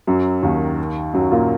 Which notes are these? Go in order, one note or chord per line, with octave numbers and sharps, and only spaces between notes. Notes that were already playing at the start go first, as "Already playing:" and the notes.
F#2 F#3
D#2 D#3
F#2 F#3
A#2 A#3